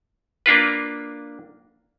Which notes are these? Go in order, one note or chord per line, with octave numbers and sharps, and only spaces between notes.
A#3 D4 F4 B4